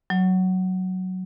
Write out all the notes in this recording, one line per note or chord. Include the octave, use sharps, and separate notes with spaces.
F#3